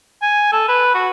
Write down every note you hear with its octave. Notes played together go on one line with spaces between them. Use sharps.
G#5
A4
B4
F#4